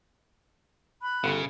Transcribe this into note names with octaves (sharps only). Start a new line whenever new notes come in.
B5 F#6
G1 C#3